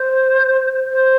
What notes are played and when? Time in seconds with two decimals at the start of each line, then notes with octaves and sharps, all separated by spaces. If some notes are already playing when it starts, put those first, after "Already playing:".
Already playing: C5
0.91 C5